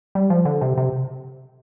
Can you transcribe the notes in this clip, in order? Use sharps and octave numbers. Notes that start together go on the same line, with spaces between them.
G3
F3
D3
C3
C3